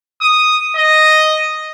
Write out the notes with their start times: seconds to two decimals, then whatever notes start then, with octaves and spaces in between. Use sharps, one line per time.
0.21 D#6
0.77 D#5